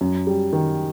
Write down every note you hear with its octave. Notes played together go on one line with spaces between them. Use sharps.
F#2
G3
D#3